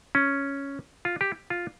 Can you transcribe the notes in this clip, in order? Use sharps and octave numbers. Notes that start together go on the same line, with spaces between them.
C#4
F4
G4
F4